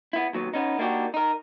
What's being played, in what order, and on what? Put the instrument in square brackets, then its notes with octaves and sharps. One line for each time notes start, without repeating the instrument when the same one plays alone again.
[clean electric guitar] B3 E4
D#2 F#3 B3
B3 C#4 D#4
A#3 D4 D#4 F#4 G4
D#4 A#4